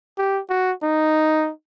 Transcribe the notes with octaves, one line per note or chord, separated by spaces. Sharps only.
G4
F#4
D#4